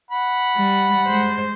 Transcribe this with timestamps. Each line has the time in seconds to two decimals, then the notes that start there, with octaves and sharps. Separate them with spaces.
0.11 F#5 B5
0.57 G3
1.06 G#3 C5